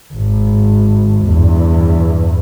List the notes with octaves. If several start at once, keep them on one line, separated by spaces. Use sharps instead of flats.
G#1
E2 G2